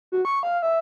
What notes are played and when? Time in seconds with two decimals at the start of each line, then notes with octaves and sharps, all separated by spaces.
0.12 F#4
0.25 C#6
0.43 F5
0.62 E5